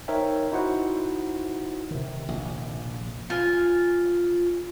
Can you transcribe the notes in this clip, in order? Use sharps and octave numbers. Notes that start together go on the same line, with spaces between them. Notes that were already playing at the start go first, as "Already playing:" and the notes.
D#4 A#4 C5 C#5 E5 G5
D#4 E4 F#4 C5 F#5
C3 D#3
A#1
F4 G#5